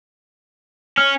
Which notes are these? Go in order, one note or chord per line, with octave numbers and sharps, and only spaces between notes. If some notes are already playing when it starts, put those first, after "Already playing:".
C#4 F6